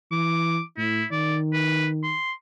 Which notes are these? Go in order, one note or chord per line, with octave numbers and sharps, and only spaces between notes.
E3 D6
A2 E4
D#3 D5
B4
C6